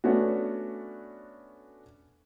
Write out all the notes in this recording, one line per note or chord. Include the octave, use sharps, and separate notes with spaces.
A3 B3 C#4 D4 F#4